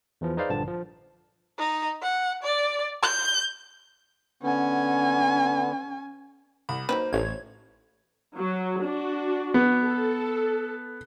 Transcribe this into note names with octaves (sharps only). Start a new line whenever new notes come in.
E2 E3 F3
D#4 G#4 B4 C5 D5 F5
A#1 G2 D3 F3 A5
F3
D#4
F#5
D5
G6
D3 B3 C#4 G#5
C2 B5
F#3 A#3 D#4 B4 C5
A1 C5 C#5 G#6
F#3
D4 F#4
B3
A4